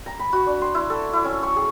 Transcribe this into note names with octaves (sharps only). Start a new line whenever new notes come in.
A#5
B5
F#4
D4
C6
E4
A4
E4
C#4
C#6
G#4